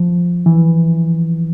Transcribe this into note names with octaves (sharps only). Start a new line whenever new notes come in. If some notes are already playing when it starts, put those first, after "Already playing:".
Already playing: F3
E3